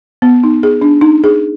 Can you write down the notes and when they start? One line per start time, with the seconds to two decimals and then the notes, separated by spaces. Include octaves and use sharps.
0.22 B3
0.44 D#4
0.63 G#4
0.81 D4
1.01 D#4
1.24 G#4